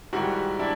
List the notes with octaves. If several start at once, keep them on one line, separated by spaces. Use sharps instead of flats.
G#2 D#3 G3 E4 F#4
D4 E4